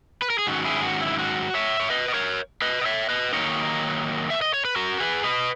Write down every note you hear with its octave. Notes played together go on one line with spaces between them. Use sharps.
B4
A#4
G#4
G#2 D#3 F#3 C#4 F#4
E4 G#4
F#4
E4
F#4
C#5 E5
C#5
B4 D#5
D#5
A#4 C#5
B4 D#5
D#5
C#5 E5
B4 D#5
D#3 F#3 A#3 D#4 A#4 C#5
E5
D#5
C#5
B4
F#4 A#4
G#4 B4
B4 D#5